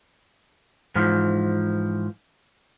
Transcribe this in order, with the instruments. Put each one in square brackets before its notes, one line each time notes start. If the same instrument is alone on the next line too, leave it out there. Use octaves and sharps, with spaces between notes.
[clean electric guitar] G#2 E3 F3